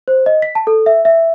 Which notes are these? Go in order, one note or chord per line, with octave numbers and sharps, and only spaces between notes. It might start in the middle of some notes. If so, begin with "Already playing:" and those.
C5
D#5
B6
A5
A4
E5
E5